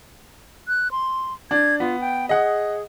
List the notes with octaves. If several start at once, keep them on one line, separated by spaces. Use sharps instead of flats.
F#6
C6
D4 G#6
B3 F4
G5
G#4 D#5 F#5